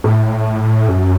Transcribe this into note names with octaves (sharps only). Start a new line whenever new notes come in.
A2
F#2